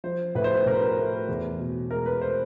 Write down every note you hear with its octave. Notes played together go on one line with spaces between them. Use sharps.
F3 C5
A2 B4
C5
B4
A2 A#4
B4
A#4
A3
E2
B2
G#3 A#4
B4
C5